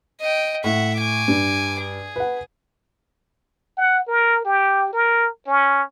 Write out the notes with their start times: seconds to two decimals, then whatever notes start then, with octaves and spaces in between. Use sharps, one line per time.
0.21 D#5 G5
0.64 A2 E5 F#5
0.97 G#5 D6
1.28 G2
1.80 G#4
2.16 B4 F#5
3.77 F#5
4.08 A#4
4.45 G4
4.93 A#4
5.47 C#4